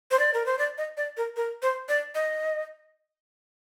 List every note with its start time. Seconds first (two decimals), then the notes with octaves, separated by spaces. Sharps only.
0.11 C5
0.19 D5
0.34 A#4
0.46 C5
0.59 D5
0.78 D#5
0.97 D5
1.17 A#4
1.36 A#4
1.62 C5
1.89 D5
2.15 D#5